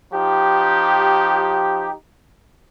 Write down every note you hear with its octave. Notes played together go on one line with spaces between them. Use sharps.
F3 D#4 G4